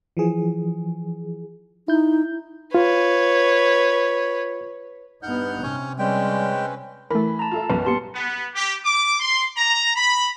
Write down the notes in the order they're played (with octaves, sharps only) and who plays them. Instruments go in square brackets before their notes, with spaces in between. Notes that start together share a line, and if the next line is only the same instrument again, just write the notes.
[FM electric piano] E3 F3 G#4
[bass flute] D#4 [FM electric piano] E4 G6
[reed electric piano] F4 [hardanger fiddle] B4 C#5
[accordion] G2 F6 G6 [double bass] B3 D#4 [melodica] F#5
[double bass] C3 [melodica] C#4 C#5
[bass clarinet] G3 [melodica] G#3 G5 [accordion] C4 C#4 B4
[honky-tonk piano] E3 [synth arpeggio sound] A3 A#4 [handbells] B5
[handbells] A5 A#5
[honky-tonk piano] F4 A4 E5
[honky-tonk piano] B1 F#2 [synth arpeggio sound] B4
[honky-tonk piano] A#2 G3 B3 [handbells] A5 C6 C#7
[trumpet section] B3
G4
D6
C6
A#5
B5